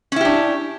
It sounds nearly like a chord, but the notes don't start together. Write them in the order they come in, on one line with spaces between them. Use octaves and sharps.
C#4 E4 G4 D4